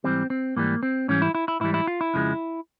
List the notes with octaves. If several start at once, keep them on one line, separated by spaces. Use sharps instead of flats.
G#2 E3 G3 C4
C4
G#2 E3 G3 A#3
C4
G#2 E3 G3 C#4
E4
E4
E4
G#2 E3 G3 E4
E4
F4
E4
F2 C#3 F3 G#3